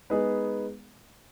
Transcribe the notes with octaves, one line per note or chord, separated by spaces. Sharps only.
G#3 B3 D#4 G#4 B4